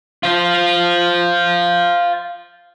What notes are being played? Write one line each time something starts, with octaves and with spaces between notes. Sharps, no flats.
F4 C5